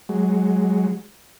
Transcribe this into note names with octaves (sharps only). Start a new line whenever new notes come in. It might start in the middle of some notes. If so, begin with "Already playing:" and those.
F#3 G#3